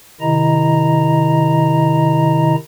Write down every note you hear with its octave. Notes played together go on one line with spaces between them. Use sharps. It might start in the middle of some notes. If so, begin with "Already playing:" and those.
C3 D#3 E4 D#5 A#5